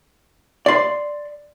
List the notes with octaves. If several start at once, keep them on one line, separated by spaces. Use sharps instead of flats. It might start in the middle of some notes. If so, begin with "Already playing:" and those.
D5 C6